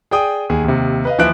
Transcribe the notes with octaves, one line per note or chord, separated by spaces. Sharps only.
G#4 D5 G5 D#6
D#2 G#4
D#2 C3
B4 D#5 F5
D#2 E3 F3 E5 F#6 D7